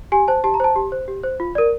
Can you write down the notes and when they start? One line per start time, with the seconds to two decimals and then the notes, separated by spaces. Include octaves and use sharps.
0.12 G4 G#5
0.28 C5 A5
0.44 G4 A5
0.54 A#5
0.60 C5 A5
0.76 G4
0.92 C5
1.08 G4
1.23 C5
1.40 F4
1.55 A#4 D5